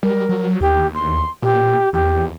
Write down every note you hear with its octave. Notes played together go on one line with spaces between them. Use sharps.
G3 A#4
F#3
D#2 G4
C6
A#2 G4
E2 G4